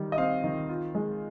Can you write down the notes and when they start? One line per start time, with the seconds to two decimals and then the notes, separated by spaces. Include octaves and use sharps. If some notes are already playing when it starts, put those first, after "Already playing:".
Already playing: D#3 G3
0.12 D#5
0.18 C4 F5
0.44 D#3
0.69 F4
0.95 G#3